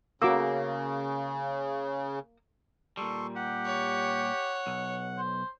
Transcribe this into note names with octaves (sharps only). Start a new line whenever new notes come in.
C#3 A#3 F#4 D6 E6
A#2 G3 A4 C6 C#6
G4 F#5
C#5
B1
C5